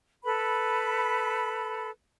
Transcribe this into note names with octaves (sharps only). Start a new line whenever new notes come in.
A4 B4 B5